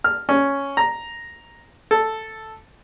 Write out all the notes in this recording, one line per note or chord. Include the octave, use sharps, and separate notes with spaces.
F6
C#4
A#5
A4